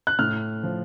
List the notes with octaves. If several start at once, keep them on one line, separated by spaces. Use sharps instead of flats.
F#6
A2 F6
F3